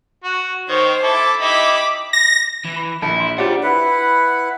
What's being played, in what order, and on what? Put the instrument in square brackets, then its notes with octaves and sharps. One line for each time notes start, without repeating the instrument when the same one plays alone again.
[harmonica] F#4
[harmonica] D#3 C#5 [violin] C5 G5
[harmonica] E4 A4 [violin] D6
[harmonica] D#4 E4 G4 [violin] B5 D6
[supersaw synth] A#6
[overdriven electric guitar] E3
[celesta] B5
[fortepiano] A#1 [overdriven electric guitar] E4 [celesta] A5 C#7
[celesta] C6 D7
[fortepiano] D4 G4 [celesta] F4 C#5 [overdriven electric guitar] C5 F#5
[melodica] E4 B4 F#5